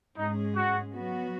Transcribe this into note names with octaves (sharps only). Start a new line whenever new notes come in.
G#2 G#3 C#4 D#4 G#4
F#4
F#3 B3 F#4